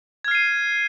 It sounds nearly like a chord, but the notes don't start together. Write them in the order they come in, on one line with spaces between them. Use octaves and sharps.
G#6 F6 C7 D#7